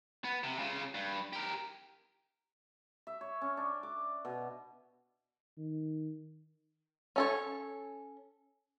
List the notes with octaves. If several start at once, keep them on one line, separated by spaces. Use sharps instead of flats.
B3
C3
C#3 F4
G2
G4 A#4
E5
C#5
C#4
D4
D6
B2
D#3
C#4 A4 C#5